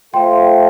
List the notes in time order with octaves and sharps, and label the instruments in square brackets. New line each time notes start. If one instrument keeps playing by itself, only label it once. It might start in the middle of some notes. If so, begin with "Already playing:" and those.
[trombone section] A3 F4 A4 C5 [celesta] G5 C6